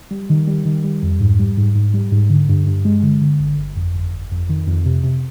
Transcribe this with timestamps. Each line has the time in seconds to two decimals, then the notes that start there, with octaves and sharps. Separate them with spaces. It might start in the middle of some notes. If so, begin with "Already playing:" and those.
0.11 G3
0.30 D#3
0.47 G3
0.65 D#3
0.84 G3
1.03 F2
1.20 G#2
1.39 G3
1.57 G#2
1.75 G#2
1.94 G3
2.12 G#2
2.30 D3
2.49 G2
2.67 G2
2.85 G#3
3.02 D3
3.21 D3
3.40 G1
3.57 G1
3.76 F2
3.95 G1
4.12 G1
4.31 F2
4.49 D#3
4.67 F2
4.85 C3
5.03 C3